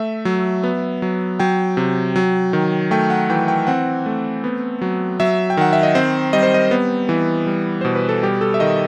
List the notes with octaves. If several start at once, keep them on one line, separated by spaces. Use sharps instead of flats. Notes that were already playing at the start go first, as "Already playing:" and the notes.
Already playing: A3 E5
F#3
B3
F#3
F#3 G5
C3
F#3
D#3
A3 G5
F#5
E3 G5
G5
C4 F#5
A3
B3
F#3
F#3 E5
G5
D#3 F#5
E5
D#5
C4 C5
G3 D#5
C5
D#5
B3
E3
G3
B2 C5
B4
A4
G3 G4
A4
E5
D#3 D#5